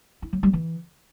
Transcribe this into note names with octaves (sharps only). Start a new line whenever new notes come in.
E4
F#3
G3
E3